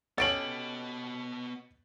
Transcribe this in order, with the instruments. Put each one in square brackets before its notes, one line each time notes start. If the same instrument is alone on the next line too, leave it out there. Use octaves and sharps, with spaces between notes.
[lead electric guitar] B3 D#5 [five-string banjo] C#4 G4 A4 [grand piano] A6 D7 F#7